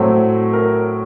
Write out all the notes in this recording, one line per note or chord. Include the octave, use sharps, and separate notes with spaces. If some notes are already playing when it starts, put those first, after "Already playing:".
Already playing: A2 F#3 A3 C4
A#4